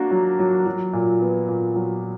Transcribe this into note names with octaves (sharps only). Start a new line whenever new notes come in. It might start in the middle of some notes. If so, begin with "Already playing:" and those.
Already playing: A#3 D4 F#4
F#3
F#3
F#3
A#2
B3
A#2
F#3